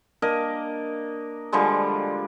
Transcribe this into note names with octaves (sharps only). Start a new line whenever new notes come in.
A#3 D4 A#4 D#5
D3 F3 G3 G#3